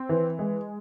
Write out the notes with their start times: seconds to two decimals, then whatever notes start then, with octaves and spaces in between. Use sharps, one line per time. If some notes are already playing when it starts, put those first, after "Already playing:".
Already playing: C4
0.09 E3
0.39 G#3